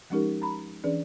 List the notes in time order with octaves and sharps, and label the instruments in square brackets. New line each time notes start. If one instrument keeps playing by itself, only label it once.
[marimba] F3 G#3 C#4 D#4 G4 A#4
A#5 B5
E3 C#4 D4 G#4 B4 D5